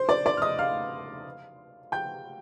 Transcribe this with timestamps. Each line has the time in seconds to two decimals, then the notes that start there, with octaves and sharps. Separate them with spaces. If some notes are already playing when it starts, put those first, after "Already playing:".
Already playing: C5 C6
0.09 D5 D6
0.26 D5 D6
0.37 F6
0.42 D#5 D#6
0.59 F5 F6
1.92 G5 G6